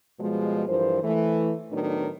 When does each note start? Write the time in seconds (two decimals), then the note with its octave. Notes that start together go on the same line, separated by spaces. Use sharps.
0.19 B2 F3 G3 G#3
0.68 G2 E3 F3 A#4 C5
1.02 E3 A3
1.72 A2 D#3 F#3 B3 D4 D#4